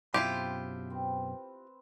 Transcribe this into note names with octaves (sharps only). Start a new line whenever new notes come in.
F#2 B2 C4 E4 F4 G4 C6
C4 B4